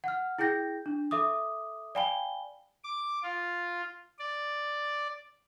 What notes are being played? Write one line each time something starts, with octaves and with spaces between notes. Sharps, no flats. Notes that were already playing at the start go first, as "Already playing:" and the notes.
F#5 F6
E4 G#4 G5 G6 A#6
D4
A4 E5 D6 D#6
D5 F5 G5 G#5 B5 G7
D6
F4
D5